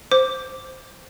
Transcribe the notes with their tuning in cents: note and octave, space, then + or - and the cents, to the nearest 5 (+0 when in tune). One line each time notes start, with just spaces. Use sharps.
C5 -5 D6 -5